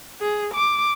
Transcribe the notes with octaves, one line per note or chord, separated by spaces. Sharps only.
G#4
D6